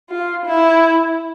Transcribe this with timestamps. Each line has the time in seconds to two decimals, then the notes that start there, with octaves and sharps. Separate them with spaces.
0.11 F4
0.45 E4